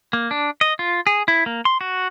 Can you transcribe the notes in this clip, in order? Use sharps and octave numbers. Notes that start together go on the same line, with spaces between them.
A#3
D4
D#5
F4
G#4
E4
A#3
C6
F#4